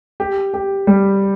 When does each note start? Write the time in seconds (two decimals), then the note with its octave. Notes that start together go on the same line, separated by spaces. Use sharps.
0.20 G4
0.54 G4
0.87 G3